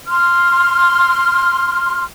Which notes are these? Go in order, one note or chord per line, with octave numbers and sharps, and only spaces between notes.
C6 F6